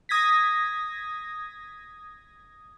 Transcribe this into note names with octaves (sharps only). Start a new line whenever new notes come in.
D#6 G#6 A#6 B6